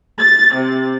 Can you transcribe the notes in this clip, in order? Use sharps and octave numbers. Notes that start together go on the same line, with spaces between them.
A6
C3